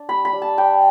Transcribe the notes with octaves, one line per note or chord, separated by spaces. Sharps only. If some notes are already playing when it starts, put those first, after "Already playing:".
Already playing: D4
G3 B5
B5
G3
A5
D4 G5